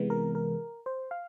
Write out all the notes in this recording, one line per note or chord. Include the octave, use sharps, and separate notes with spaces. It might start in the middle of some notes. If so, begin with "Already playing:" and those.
Already playing: C3 E3 G#3 B3
A#4
A#4
C5
F5